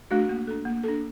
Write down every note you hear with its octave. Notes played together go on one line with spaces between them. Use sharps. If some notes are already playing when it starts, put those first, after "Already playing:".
A3 D4 F#4
A#3
D4 A4
A#3
D4 A4